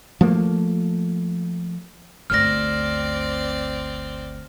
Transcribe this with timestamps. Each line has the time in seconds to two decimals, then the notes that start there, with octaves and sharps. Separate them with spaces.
0.21 F3 A3 A#3
2.30 G1 D2 C4 D5 F6 A#6